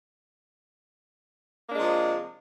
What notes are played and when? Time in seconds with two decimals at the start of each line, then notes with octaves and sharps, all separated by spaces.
1.67 A#3
1.70 D4
1.73 G#3
1.77 C3
1.80 F3